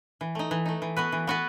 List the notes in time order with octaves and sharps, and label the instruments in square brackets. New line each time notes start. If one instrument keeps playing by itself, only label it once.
[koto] E3
A3 D#4
E3
A3 D#4
E3
B3 F#4 B4
E3
B3 F#4 B4